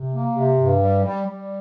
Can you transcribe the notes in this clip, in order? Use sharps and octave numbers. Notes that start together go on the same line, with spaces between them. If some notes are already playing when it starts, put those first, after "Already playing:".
Already playing: C3
A#3
C3
G2
G3
G3
G3